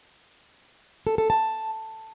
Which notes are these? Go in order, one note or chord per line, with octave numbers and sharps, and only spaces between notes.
A4
A4
A5